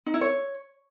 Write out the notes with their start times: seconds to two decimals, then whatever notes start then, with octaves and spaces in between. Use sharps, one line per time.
0.06 D#4
0.14 E4
0.21 C#5